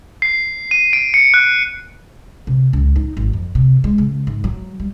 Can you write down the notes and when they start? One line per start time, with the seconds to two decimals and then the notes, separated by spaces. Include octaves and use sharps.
0.22 C7
0.71 D#7
0.93 D7
1.14 C#7
1.34 F#6
2.47 C3
2.73 C#2
2.96 D#4
3.17 G#1
3.33 F2
3.55 C3
3.84 G#3
3.98 C#3
4.27 G#2
4.44 F#3
4.80 G3